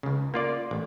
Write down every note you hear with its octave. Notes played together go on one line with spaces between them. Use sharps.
C#2 C#3
A#3 F4 D5
A1